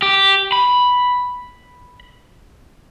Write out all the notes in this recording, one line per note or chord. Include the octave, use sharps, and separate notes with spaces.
G4
B5